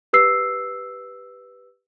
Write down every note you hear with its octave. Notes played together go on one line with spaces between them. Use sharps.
G4 B4 E6 C7